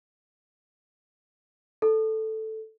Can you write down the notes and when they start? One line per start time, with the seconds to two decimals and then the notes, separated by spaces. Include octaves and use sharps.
1.82 A4